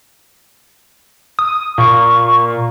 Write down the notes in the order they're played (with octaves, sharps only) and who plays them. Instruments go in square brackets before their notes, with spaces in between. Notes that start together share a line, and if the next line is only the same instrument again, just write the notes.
[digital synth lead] D#6
[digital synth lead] A#2 [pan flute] C#6